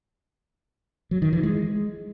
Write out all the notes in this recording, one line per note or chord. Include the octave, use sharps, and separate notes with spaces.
F#3
D#3
E3
G#3